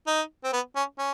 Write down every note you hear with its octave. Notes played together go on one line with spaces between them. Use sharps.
D#4
C4
B3
C#4
C#4